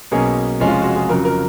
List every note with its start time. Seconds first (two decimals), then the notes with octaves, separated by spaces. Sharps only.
0.11 B1 B2 A#3 C#4 G#4
0.60 F1 F2 F3 G#3 C#4
0.67 F4
0.82 F#4
0.96 G#4
1.08 F2 C#3 F#3 A#4
1.25 A#4